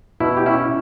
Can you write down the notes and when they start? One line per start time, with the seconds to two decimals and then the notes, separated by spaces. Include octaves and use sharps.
0.20 B2 E4
0.37 G4
0.46 C#4 E4